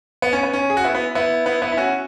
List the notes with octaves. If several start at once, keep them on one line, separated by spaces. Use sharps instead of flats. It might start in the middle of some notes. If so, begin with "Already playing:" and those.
B3
C#4
B3
C#4
G#4
F#4
B3 E4
B3 E4
B3 E4
B3 E4
B3 E4
E4
C#4 F#4